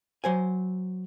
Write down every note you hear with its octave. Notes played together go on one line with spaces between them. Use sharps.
F#3 C5 G#5